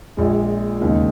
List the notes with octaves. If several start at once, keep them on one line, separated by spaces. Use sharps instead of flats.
A#1 A#2 G#3
E1 D#2 C#3 G#3 D#4